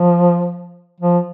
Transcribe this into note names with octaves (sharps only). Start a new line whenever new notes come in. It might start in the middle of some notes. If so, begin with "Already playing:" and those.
Already playing: F3
F3